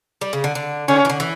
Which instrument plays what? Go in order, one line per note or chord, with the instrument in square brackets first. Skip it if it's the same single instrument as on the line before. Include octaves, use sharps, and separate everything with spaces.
[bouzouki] G3
C#3
D3
D3
[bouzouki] D3 [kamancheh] C#4
[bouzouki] E3
D3
E3